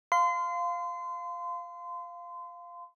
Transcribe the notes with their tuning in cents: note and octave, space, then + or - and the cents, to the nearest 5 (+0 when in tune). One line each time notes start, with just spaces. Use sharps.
F5 +0 C6 -30